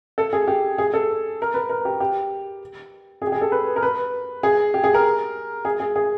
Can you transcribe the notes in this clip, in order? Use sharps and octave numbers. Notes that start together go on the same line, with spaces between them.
A4
G#4
G4
G#4
A4
A#4
B4
A#4
G4
G4
G#4
G4
G#4
A4
B4
A#4
B4
G#4
G4
G#4
A#4
G#4
G#4
G#4